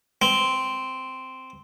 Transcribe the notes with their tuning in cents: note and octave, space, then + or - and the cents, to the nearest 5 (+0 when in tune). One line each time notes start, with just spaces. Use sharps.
C4 -10